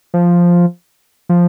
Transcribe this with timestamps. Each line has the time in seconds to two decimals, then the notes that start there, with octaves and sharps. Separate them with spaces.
0.14 F3
1.29 F3